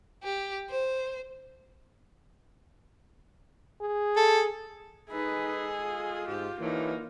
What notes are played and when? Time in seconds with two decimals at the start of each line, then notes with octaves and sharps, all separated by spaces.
0.23 G4
0.70 C5
3.81 G#4
4.17 A4
5.09 G#3 D#4 G#4 A4 B4 D#5
5.82 F4
6.28 G#2 G4
6.61 D3 E3 F#3 G3 A#3 D#4